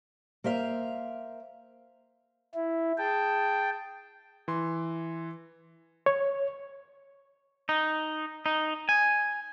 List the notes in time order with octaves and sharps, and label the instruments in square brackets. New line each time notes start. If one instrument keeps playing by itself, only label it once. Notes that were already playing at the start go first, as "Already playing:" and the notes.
[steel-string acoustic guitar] A#3 C5 E5 F5
[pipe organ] E4
[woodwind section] G#4 A5 [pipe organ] G5
[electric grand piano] E3 C6
[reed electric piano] C#5
[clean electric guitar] D#4
D#4
G#5